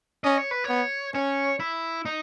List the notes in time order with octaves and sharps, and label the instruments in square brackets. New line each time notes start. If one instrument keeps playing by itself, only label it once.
[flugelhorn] C#4 [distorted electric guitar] D#5
[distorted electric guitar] C#5
B4
[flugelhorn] B3 [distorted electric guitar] C#5
[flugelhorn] C#4 [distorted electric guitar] C#5
[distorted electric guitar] E4
D#4